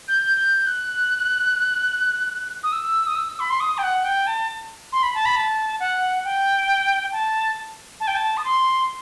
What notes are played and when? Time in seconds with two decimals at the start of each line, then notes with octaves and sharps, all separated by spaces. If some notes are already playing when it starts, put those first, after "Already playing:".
0.08 G6
0.37 G6
0.67 F#6
2.63 D#6
2.72 E6
3.07 D#6
3.16 E6
3.40 B5
3.50 C6
3.60 D#6
3.78 G5
3.83 F#5
4.04 G5
4.27 A5
4.92 C6
5.03 B5
5.15 A5
5.25 B5
5.36 A5
5.80 F#5
6.24 G5
7.12 A5
8.00 A5
8.07 G5
8.15 A5
8.37 D#6
8.45 C6